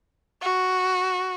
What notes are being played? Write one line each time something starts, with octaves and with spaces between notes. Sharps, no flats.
F#4